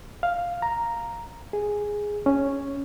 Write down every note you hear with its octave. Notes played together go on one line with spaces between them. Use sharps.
F5
A#5
G#4
C#4